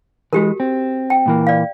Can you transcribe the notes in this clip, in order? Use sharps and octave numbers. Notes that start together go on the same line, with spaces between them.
E3 G#3 F#4 G4 A#4
C4
G5
A#2 E3 A#3
D5 F5